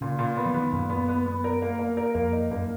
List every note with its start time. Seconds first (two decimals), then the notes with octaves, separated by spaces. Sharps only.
0.01 A#2 C#3
0.19 A#2
0.37 B3
0.46 F3
0.54 D#3 B3
0.73 F#2 A#2
0.90 B3
1.08 B3
1.26 B3
1.44 A#4
1.62 A#3
1.79 A#3
1.97 A#4
2.15 F2 A#3
2.32 D#4
2.51 F#2 A#3